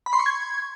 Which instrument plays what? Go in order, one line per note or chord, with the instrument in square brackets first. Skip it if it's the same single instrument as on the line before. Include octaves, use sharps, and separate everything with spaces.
[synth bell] B5
C6
C#6
G#6